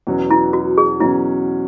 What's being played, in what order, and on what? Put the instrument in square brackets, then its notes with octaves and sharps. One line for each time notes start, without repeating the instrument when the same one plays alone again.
[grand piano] E2 B2 F#3 C#4
[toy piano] E4
F#4
G#4
[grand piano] E2 B2 F#3 C#4 [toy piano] E4